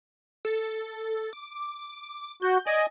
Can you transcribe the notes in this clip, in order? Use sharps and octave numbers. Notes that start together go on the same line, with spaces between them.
A4
D6
F#4 G6
D5 D#5 G#5